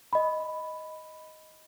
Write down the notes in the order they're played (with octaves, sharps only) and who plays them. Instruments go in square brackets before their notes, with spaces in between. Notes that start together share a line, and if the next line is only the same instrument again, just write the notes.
[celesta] D#5 B5